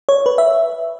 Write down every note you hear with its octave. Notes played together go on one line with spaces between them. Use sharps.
C#5
B4
E5